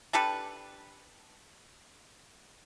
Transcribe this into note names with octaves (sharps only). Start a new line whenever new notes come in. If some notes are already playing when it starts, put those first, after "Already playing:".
D4 G4 A4 B4